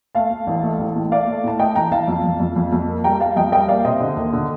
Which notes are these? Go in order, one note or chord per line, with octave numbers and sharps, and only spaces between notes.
A3 F5 A5
A3
A1
A3
A1
A2
A3 D5 F5
A3
A2 A5
A3 D#5 G5
A1 G5 A#5
A1 F5 A5
F2
F2
F2
F2
F2
A#3
G3 G5 A#5
G3 F5 A5
F2 D#5 G5
G3 D#5 G5
A#3 D5 F5
C3 C5 D#5
D3
D#2
D3